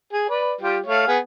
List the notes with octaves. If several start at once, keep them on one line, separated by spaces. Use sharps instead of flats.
G#4
B4 D5
G3 F4 G4
A3 C#5 F5
B3 G#4